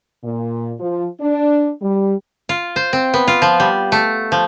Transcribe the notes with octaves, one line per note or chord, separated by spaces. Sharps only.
A#2
F3
D4
G3
F4
C5
C4
B3
F4
F3
G3
A3
F3